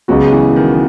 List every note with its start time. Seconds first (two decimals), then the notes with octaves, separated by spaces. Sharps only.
0.08 C#2 C#3 F#3 G#3 B3 F#4
0.32 E3
0.56 D#3